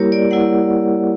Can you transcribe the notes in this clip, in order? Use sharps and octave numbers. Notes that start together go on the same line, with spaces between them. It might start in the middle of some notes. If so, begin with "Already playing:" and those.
Already playing: G3 A#3 E4 G4 A#4 C#5
D5
G3 A#3 E4 F#5